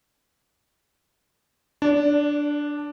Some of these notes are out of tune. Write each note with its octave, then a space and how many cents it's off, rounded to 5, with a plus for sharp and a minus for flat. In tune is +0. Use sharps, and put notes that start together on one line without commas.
D4 +0 D5 -30